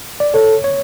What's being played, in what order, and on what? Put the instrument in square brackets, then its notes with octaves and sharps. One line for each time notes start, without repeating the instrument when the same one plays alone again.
[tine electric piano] D5
[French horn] A4 [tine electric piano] C#5
[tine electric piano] C#5